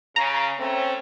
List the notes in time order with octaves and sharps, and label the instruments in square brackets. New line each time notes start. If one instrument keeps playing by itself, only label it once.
[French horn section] C#3 [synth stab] A#5
[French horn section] A3 C#4 [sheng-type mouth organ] C4